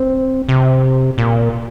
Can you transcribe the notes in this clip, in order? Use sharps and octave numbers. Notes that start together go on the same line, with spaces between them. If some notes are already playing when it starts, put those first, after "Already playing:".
Already playing: C4
C3
A#2